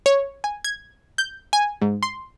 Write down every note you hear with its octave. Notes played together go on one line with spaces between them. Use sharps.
C#5
G#5
G#6
G6
G#5
G#2
C6